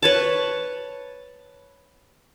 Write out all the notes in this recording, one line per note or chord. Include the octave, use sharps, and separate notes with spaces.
B4 C#5 A5